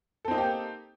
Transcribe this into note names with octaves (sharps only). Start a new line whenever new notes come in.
A#3 C4 D#4 G4 A4